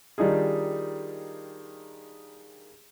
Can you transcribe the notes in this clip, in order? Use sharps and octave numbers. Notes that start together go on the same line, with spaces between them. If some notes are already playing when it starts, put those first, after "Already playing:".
D#3 G3 D4 D#4 F4 G#4